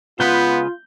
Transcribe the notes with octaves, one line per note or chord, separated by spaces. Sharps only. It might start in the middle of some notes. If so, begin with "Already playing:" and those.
C#3 G#3 B3 F4 B4 G6